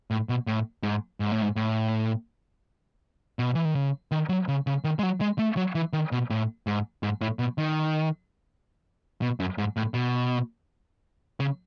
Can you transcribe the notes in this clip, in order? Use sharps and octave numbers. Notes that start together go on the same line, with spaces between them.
A2
B2
A2
G#2
G#2
A2
G#2
A2
B2
E3
D#3
C#3
D#3
F#3
C#3
C#3
D#3
G#3
F#3
G#3
A3
F#3
E3
D#3
B2
A2
G#2
G#2
A2
B2
D#3
B2
F#2
G#2
A2
B2
C#3